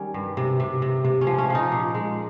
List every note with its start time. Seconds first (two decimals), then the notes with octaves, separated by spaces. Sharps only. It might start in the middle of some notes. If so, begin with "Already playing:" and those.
Already playing: D#3 G3 C#4
0.14 G2
0.37 C3
0.60 C3
0.82 C3
1.05 C3
1.21 C#4
1.27 F3
1.38 C#4
1.50 F3 D#4
1.72 A#2
1.94 G#3